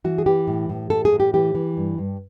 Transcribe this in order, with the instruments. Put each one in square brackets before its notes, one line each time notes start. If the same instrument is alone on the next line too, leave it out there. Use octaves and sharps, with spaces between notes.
[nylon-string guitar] E3 F#4
G#4
E3 G4
A2
A2
A2 A4
G#4
A2
G4
E3 G4
E3
G2
G2